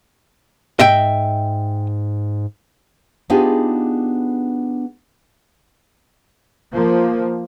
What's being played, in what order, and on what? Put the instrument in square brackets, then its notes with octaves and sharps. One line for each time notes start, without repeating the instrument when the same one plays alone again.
[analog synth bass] G#2 [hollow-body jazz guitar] D#5 E5 G5
[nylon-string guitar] B3 D4 D#4 F4 G4 G#4
[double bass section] F3 A#3